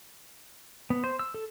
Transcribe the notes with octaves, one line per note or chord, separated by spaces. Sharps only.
B3
C5
E6
A4